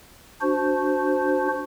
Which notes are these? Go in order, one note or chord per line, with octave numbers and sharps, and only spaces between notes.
D4 F#4 C5